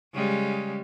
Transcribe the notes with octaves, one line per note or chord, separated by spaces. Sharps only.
C#3 G3 G#3